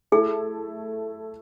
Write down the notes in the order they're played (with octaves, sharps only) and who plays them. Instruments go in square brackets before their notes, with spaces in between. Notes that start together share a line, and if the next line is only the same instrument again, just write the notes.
[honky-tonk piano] A3 E4 A4 [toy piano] G#4